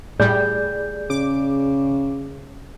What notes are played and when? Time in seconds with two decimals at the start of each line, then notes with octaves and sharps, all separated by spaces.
0.20 A2 G3 G#4 D5 G6
1.10 C#3 D6